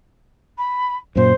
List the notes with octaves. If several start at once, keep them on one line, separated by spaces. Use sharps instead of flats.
B5
F#2 A#2 C5